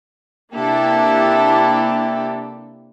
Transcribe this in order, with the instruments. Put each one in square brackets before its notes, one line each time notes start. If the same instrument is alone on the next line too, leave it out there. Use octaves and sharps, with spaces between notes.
[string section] C3 A#3 D4 E4 G4 A4